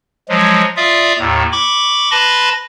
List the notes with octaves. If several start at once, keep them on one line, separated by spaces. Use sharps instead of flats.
F3 F#3 G#3
F4 D5 E5 F5 D#6
D#2 A2
B5 C#6 D6
B4 A5 B5 C6 A#6